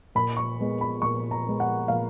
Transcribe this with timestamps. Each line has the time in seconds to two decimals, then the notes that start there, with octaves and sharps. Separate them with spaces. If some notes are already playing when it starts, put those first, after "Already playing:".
0.15 A#2 B5
0.37 C#6
0.59 G#3 B3
0.81 B5
1.02 A#2 C#6
1.31 A#5
1.45 G#3 B3
1.60 F#5
1.88 A#2 F5